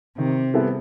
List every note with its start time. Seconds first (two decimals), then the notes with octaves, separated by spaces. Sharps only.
0.18 C3 D#3
0.54 G3 B3 E4 A4